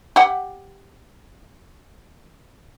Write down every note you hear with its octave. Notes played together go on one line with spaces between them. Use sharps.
G4 F#5